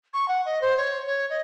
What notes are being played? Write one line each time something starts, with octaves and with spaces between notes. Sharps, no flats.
C#6
F#5
D#5
C5
C#5
C#5
D#5